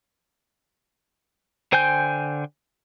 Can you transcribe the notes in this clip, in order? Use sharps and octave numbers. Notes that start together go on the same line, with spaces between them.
D3 C5 G5 G#5 G6